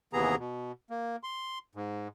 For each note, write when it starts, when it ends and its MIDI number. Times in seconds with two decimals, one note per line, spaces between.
0.13 0.36 39
0.13 0.36 48
0.13 0.36 52
0.13 0.36 59
0.13 0.36 68
0.13 0.36 82
0.39 0.72 47
0.90 1.16 58
1.23 1.59 84
1.75 2.08 44